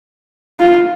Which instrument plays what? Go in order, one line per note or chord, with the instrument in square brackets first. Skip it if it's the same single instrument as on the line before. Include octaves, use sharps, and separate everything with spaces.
[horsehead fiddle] F4